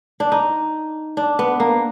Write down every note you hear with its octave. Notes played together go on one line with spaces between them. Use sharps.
D4
D#4
D4
B3
A#3